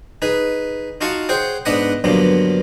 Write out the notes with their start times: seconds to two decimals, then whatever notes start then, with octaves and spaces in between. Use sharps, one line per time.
0.22 D#4 G#4 B4
1.01 D#4 F4 F#4 F5 A5 C#6
1.29 G#4 C5 C#5 F#5 G5
1.65 G#2 B3 D4 B4 D#5 F#5
2.04 G2 D3 F3 F#3 A#3 B3